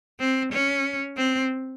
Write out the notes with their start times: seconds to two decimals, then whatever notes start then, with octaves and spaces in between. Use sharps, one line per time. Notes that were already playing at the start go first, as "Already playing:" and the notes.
0.20 C4
0.52 C#4
1.17 C4